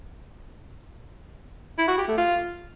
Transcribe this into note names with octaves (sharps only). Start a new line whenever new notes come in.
E4
F#4
G4
A3
F4